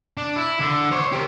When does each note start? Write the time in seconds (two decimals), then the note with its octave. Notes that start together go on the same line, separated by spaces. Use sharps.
0.17 D4
0.36 E4
0.61 D3
0.92 C5 C#5
1.13 G4 A#4